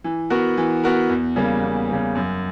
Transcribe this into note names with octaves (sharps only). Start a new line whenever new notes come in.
E3
B3 F#4 A#4
E3
B3 F#4 A#4
E2
C#3 G3 A#3
E2
C#3 G3 A#3
F#2